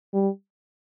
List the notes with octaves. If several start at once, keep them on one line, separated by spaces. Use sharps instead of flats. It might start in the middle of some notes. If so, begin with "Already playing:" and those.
G3